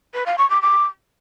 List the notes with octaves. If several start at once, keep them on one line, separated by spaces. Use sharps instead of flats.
B4
F5
C#6
D6
D6